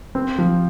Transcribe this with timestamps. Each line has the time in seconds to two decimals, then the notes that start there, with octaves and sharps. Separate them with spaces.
0.15 C4
0.38 F3